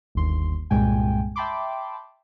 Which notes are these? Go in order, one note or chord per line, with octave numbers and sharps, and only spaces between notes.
G1 D#2 C6
C2 G2 A#2 G#3 G5 G#5
E5 G5 A5 B5 C6 D6